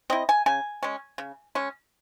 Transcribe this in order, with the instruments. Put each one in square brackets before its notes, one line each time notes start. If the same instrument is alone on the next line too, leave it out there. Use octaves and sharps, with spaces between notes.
[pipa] C4 E4 D#5
G#5
C#3 G#5
G#3 C#4
C#3
G#3 C#4